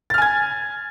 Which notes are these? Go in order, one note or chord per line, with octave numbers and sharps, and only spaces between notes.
G#5 F6 G#6 A6